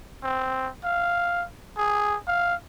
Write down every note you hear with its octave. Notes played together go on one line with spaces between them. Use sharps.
C4
F5
G#4
F5